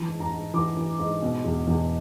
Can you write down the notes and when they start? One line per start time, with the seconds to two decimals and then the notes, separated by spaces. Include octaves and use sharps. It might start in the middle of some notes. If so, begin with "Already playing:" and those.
Already playing: E3 A5
0.08 G#2
0.20 A#5
0.32 G#2
0.54 E3 D6
0.77 E3
0.99 G#2
1.22 B2
1.44 E2
1.67 E2